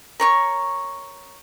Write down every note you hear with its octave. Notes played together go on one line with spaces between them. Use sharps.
A#4 C#5 C#6